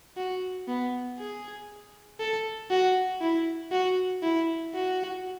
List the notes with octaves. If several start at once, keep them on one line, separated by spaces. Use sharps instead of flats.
F#4
B3
G#4
A4
F#4
E4
F#4
E4
F#4